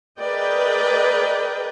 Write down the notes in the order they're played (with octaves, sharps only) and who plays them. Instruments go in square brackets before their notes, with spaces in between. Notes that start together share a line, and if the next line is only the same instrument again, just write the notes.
[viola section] G#4 A#4 B4 D5 D#5 G5